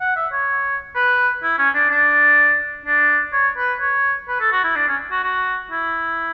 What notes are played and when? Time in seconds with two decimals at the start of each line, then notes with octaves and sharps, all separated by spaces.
0.01 F#5
0.16 E5
0.32 C#5
0.96 B4
1.43 E4
1.59 C#4
1.75 D4
1.91 D4
2.86 D4
3.33 C#5
3.57 B4
3.80 C#5
4.28 B4
4.40 A4
4.52 F#4
4.64 E4
4.76 D4
4.88 C#4
5.11 F#4
5.23 F#4
5.71 E4